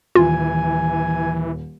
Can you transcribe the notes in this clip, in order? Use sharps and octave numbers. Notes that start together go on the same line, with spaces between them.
D#1 E3 F4 G#5